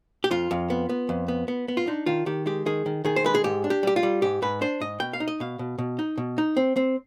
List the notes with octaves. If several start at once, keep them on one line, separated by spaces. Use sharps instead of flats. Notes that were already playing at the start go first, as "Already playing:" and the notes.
G4
F2 F4
F2
B3
B3
F2
B3
B3
B3
F4
D4 D#4
D#3 F4
D#3 G4
G#3 G4
D#3 G#4
D#3
D#3 G#4
C5
G#3 B4
G#4
G#2 G4
D4
G4
G3 G4
F4
G3
G#2 G4
G#2 B4
D4 C5
G#2 D#5
B2 G5
F5
D#4
D#5
B2 F5
B2
B2
D#4
B2
D#4
C4
C4